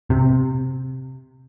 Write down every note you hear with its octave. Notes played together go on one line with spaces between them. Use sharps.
C3